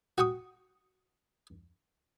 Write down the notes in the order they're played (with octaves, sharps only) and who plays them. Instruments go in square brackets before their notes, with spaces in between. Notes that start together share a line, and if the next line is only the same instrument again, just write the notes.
[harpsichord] F#4 G5 C#6 D#6